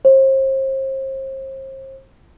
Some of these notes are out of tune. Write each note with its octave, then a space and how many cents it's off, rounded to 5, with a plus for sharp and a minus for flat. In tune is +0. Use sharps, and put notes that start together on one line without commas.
C5 +40